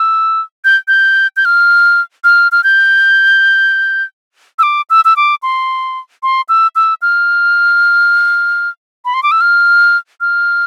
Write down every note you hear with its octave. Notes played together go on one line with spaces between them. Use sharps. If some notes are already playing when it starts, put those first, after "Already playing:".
Already playing: E6
G6
G6
G6
F6
F6
F6
G6
E6
D6
E6
E6
D6
C6
C6
E6
E6
F6
B5
C6
D6
E6
F6
F6